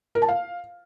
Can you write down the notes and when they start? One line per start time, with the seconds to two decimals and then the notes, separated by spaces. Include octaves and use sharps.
0.15 A#4
0.22 A5
0.28 F5